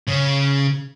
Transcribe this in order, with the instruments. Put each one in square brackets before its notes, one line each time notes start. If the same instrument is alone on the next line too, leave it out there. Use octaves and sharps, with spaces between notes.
[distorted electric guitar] C#3